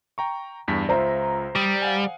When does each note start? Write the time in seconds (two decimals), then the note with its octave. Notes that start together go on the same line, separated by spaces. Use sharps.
0.18 G5 A#5 C#6
0.68 E2 G2 B6
0.89 C#2 F4 C5 E5 A#5
1.56 G3 D#6
1.82 F5 F#5 G#5